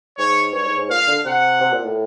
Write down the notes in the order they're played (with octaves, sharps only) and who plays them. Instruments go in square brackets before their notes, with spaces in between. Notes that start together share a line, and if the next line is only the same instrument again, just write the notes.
[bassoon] G#2 [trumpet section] C#5
[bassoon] G2 [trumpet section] C#5
[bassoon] G#2
G#2
[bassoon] A#2 [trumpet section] F5
[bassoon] D3
[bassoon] C3 [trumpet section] F#5
[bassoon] C3
A#2
A2